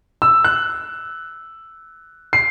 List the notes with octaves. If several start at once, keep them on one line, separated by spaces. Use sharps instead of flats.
E6
F#6
C7